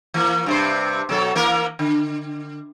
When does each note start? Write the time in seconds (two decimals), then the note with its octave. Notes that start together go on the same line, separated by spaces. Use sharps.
0.14 E3 A#3
0.46 G2 C3 C5
1.09 B2 F#3 A4
1.35 E3 A#3 A#4
1.79 D3